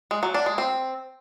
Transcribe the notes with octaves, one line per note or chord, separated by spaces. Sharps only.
G#3
F#3
D4
G#3
C4